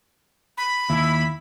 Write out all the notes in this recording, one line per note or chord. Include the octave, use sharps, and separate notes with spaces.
B5
D#2 E4